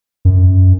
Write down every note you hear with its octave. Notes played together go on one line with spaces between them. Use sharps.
F#2